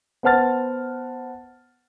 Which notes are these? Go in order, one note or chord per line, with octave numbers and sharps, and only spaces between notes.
B3 C5 F#5 A5 F6 A6